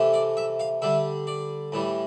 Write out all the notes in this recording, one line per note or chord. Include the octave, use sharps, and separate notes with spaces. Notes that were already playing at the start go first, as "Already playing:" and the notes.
Already playing: C3 E3 A3
D5
E5
F5
D3 G3 E5
D5
A2 E3 G3